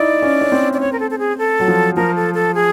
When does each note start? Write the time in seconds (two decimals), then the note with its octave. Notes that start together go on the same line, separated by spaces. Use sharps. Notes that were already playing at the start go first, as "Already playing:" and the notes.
Already playing: D#4 E4 D5
0.22 C#4
0.41 C#4
0.52 C4
0.73 D5
0.80 C#5
0.93 A#4
1.00 A4
1.11 A4
1.19 G#4
1.38 A4
1.60 F#3
1.68 F3
1.97 F3 A#4
2.15 A4
2.34 A4
2.55 G#4